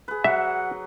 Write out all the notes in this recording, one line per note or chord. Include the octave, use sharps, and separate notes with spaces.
G#4 B4
F#3 E5 F#5